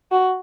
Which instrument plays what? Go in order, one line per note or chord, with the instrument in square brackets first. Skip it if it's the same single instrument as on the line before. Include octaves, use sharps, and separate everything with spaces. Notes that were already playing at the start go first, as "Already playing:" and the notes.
[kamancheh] F#4